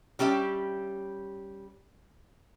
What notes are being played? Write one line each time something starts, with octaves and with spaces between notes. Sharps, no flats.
G3 C#4 G4 E5